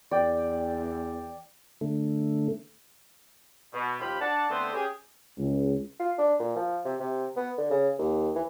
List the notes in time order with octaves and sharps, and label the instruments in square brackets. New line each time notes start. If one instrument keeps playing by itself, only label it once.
[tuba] E2 [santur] D5 G5
[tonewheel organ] D3 A3
[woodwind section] B2
D#2 F3 F4 G4 B5
D4 D5 F#5 A5
D3 A3 B3 C4 B4 C5
C#4 G4 G#4
[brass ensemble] C#2
[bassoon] F4
D4
A#2
F3
C3
C3
B3
D3
C#3
D#2
E3